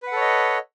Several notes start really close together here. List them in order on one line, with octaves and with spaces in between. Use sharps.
B4 F#5 A4 C#5 D#5